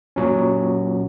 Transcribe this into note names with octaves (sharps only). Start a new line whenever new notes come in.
A#2 F#3 C#4